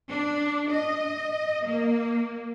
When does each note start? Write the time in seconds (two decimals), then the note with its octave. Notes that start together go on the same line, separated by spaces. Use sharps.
0.10 D4
0.70 D#5
1.64 A#3